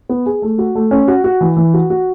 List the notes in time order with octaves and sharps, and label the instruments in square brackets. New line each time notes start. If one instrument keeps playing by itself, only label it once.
[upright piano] B3
G#4
A3
F#4
A3
C#4
F#4
F#4
E3
E3
F#4
F#4